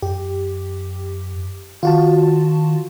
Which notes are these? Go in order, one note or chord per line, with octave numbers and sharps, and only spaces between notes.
F#2 G4
D#3 F4 F#4 A5